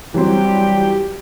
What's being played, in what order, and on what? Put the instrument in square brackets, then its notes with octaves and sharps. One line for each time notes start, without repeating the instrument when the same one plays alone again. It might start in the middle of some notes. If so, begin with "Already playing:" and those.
[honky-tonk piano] E3 F#3 C4 [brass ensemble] G3 [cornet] G4